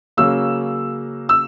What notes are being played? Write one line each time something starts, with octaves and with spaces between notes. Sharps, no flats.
C#3 F#3 A#3 E6
E6